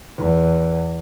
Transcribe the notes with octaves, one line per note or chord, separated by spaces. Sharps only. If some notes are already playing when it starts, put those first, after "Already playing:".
E2